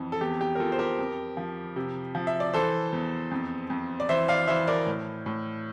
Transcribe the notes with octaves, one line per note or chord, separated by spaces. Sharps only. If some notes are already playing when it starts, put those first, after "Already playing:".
Already playing: F2 E3
A4
E2 G4
G4
A#4
E2 F4 A4
C5
G4 A#4
F2
F3
C3
F3
E5
D5
E3 A4 C5
E2
F2
F2
D5
E3 C5 E5
D5 F5
E3 C5 E5
A#4 D5
A2
A2